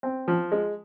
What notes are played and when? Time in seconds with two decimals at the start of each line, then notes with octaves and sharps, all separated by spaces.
0.03 C4
0.28 F3
0.52 G#3